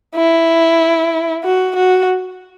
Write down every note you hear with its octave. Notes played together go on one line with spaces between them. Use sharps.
E4
F#4
F#4